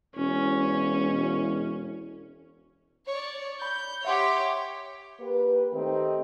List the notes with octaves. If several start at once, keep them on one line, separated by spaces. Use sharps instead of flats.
E1 C#4
C#5 D5
B5 G6
G4 C#5 E5 F#5 C6
A#3 G4 B4
D#3 A3 C4 D#4 G4